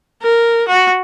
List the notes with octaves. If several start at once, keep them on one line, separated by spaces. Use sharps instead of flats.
A#4
F#4